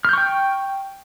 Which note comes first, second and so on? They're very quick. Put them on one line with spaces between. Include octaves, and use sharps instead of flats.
F6 G6 C#6 G5